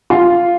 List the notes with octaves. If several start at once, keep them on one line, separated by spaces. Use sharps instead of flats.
F4